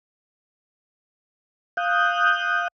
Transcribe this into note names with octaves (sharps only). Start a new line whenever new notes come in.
F5 D#6 F#6 G6